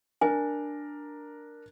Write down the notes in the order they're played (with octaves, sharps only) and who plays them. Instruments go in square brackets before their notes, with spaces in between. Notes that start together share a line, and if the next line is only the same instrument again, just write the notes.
[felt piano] D4 A#4 [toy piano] G#5